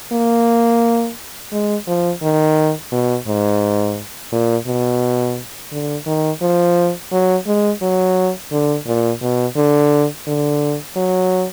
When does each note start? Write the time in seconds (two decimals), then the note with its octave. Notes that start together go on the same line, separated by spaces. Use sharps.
0.12 A#3
1.52 G#3
1.87 F3
2.23 D#3
2.92 B2
3.27 G#2
4.32 A#2
4.67 B2
5.72 D3
6.07 D#3
6.42 F3
7.12 F#3
7.47 G#3
7.82 F#3
8.52 D3
8.87 A#2
9.22 B2
9.57 D3
10.27 D3
10.96 F#3